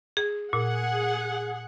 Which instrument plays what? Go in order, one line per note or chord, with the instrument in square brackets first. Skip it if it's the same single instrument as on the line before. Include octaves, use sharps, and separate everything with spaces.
[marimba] G#4
[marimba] A#2 [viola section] G#4 F#5